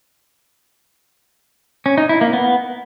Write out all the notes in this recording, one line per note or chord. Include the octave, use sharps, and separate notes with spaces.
C#4
D#4
E4
A#3
B3